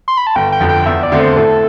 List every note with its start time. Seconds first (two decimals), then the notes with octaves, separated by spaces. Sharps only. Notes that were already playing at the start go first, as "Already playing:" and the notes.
0.08 C6
0.17 B5
0.27 A5
0.35 G1 G5
0.52 G5
0.60 F2 D3
0.69 G5
0.86 E2 E5
1.03 D5
1.12 D3 A3 C4
1.20 C5
1.37 A2 A4